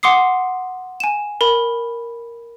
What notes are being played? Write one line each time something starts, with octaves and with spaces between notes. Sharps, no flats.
F#5 C6 D6 D#6 C7
G#5 E7
A#4 B5